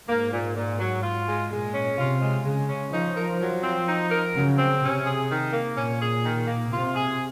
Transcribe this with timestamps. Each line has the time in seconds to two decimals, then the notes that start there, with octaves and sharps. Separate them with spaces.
0.08 G#2 A#3
0.32 A#2
0.56 A#2
0.79 F#3
1.03 F4
1.27 G#3
1.50 A#2 G#3
1.74 C#4
1.98 C3 F4
2.22 G#3
2.45 C#3 G#3
2.69 C#4
2.92 F3 D#4
3.17 A#4
3.40 F#3
3.63 C4
3.87 D#4
4.11 A#4
4.35 C#3 F#3
4.58 C4
4.82 C3 C#4
5.06 G#4
5.29 D#3
5.53 A#3
5.76 A#2 C#4
6.01 G#4
6.24 D#3
6.47 A#3
6.71 C3 F4
6.95 G#4